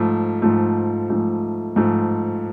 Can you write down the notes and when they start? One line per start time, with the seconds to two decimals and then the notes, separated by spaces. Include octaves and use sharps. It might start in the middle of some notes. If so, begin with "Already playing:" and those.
Already playing: G#2 F3 A3
0.42 G#2 F3 A3
1.10 G#2 F3 A3
1.76 G#2 F3 A3